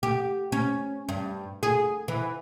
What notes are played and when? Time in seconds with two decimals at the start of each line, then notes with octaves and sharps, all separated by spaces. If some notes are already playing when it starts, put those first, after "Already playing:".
0.03 G4
0.52 C#4
1.09 G2
1.63 G#4
2.08 E3